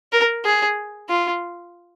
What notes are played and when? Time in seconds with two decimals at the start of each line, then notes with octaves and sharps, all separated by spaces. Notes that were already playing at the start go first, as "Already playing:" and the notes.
0.13 A#4
0.45 G#4
1.09 F4